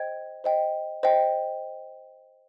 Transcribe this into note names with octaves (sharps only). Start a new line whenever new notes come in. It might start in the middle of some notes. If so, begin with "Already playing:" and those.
Already playing: C5 D#5 G5 G#6
C5 D#5 G5
C5 D#5 G5